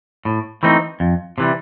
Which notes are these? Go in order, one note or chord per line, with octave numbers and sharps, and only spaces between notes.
A2
E3 A3 C4 D#4
F2
C3 E3 G3